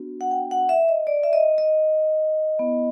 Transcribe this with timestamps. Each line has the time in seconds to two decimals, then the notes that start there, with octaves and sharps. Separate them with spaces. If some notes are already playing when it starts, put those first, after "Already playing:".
Already playing: B3 D4 F#4
0.21 F#5
0.31 G5
0.51 F#5
0.69 E5
0.89 D#5
1.07 D5
1.24 E5
1.33 D#5
1.58 D#5
2.59 B3 E4